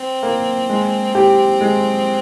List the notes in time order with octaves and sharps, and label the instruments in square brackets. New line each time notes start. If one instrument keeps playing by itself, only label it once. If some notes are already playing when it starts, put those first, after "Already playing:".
Already playing: [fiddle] C4
[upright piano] A#3
G#3
G4
G#3